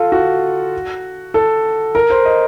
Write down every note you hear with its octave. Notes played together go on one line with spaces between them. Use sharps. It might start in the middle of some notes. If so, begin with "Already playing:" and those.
Already playing: F4 A4
F#4
A4
A#4
C5
D#5